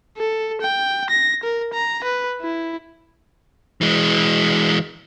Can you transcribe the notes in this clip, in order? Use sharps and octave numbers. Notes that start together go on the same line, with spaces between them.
A4
G5
A#6
A#4
A#5
B4
E4
E3 G#3